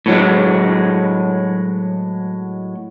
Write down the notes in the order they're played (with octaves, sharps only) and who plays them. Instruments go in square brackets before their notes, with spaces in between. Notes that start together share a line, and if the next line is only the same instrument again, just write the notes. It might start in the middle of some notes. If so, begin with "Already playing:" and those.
[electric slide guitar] A2 F#3 G#3